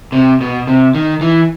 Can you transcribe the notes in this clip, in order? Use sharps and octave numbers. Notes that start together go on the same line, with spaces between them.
C3
B2
C3
D#3
E3